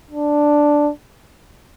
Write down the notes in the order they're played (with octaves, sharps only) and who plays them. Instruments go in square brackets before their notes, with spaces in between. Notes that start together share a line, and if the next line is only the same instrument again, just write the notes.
[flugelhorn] D4